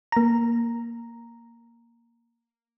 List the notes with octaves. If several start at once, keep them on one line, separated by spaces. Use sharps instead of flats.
A#3 A#5